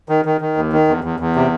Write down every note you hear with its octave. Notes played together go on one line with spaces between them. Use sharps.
D#3
D#3
D#3
D#2
D#3
E2
E2
E2
C3